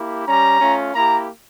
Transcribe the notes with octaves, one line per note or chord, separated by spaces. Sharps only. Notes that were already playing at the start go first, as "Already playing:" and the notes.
Already playing: A#3 E4 G4
G3 C#4 G4 A#5
A3 C#4 F4
A#3 E4 G4 A#5